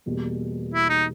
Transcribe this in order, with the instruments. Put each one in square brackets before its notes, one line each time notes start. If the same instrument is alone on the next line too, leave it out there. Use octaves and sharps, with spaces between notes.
[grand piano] E2 B2 G3 A#3
[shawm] E4
D#4